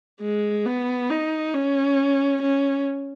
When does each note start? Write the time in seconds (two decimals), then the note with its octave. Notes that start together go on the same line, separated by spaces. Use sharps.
0.21 G#3
0.65 B3
1.10 D#4
1.54 C#4
2.42 C#4